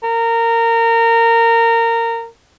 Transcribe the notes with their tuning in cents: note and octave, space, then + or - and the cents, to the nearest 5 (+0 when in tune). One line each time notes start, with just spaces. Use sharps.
A#4 -20